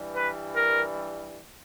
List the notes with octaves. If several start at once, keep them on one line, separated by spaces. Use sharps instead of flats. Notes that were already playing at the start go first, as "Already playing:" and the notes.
Already playing: G2 E3 G3
B4
A#4